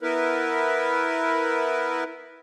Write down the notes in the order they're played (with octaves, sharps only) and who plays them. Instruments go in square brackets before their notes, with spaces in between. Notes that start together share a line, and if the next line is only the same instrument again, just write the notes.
[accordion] B3 E4 A#4 B4